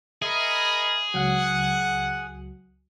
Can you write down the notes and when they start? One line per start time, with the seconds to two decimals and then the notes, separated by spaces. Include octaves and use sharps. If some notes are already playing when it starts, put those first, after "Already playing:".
0.22 G#4 A#4 D#5 E5 B5 C#7
1.14 C#2 F#3 F#5